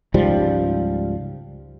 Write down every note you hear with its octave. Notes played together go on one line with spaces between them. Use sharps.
C#2 G#2 F3 G3